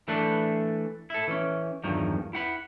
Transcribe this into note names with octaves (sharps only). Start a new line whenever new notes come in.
E3 A3 D4 A4 B4
E4 A4
E3 C#4
E2 G2 D#3 F3 F#3
E4 F#5 B5